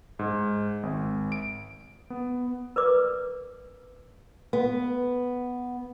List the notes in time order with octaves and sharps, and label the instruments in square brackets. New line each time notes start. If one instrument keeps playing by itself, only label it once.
[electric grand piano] G#2
G#1
D7
B3
[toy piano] A#4 B4 D5 D6
[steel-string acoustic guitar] B3